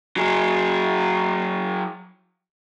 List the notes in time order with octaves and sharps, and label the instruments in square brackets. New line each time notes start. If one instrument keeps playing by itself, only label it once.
[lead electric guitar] F#3 G#4